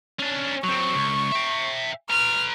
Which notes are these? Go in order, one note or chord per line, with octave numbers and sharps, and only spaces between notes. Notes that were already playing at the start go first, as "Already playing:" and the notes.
C#4 D4
F#3 C4 C#6
C#2
E5 G5
B4 A#5 F6